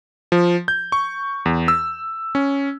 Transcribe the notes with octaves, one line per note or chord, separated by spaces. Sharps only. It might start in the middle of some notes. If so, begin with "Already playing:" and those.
F3
G6
C#6
E2
E6
C#4